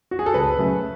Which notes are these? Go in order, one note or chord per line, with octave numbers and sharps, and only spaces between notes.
F#4
G#4
A4
C#2 B4
C#3 F#3 A3